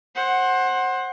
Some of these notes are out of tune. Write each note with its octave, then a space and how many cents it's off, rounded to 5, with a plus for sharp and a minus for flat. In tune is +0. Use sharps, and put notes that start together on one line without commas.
C5 +20 F#5 +0